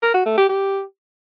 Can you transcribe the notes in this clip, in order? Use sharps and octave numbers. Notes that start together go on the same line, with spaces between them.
A#4
F#4
A3
G4
G4